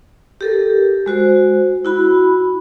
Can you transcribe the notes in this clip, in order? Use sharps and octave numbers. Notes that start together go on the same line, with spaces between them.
G4 A4 A#4
G#3 F#4 C5
E4 F#4 B5